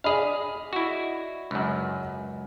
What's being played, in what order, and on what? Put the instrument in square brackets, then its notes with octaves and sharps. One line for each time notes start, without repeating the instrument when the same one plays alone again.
[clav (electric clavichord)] G#4 F5 [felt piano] D5 D#5 B5
[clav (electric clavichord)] E4 F#4
C#2 F#2